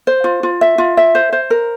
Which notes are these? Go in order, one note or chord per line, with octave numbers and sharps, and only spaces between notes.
C5
F4
F4
E5
F4
E5
C5
C5
A#4